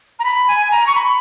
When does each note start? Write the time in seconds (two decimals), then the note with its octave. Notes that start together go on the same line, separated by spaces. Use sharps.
0.19 A#5
0.24 B5
0.48 G#5
0.71 A#5
0.87 C#6
0.95 B5